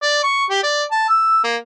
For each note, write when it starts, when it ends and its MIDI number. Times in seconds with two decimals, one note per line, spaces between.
0.02 0.20 74
0.24 0.45 85
0.50 0.60 67
0.63 0.84 74
0.91 1.07 81
1.09 1.40 88
1.44 1.57 58